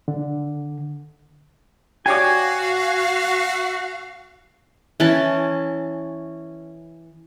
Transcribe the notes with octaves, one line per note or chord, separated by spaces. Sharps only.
D3
F#4 G4 C#5 D5 F5 G#5
E3 C#4 A5